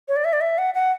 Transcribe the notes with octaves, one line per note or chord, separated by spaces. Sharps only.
C#5
D5
E5
D5
E5
F#5
F#5